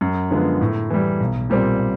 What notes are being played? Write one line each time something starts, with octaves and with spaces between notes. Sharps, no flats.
F#2
D3 F3 G#3 B3
A2
E3 G3
B1
A#2 G3 C4